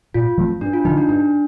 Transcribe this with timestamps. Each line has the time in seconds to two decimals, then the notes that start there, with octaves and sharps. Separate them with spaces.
0.14 A#2 F4
0.37 F3 A3 C4
0.61 G2 D4
0.73 F4
0.85 D3 F3 D#4
0.97 D4
1.09 G2 D4